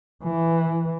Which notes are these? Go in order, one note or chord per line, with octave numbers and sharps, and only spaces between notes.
E3